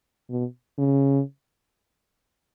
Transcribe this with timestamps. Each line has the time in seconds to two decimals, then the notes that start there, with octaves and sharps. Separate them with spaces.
0.30 B2
0.78 C#3